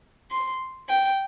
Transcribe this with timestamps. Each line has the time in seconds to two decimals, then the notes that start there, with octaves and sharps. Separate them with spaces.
0.31 C6
0.89 G5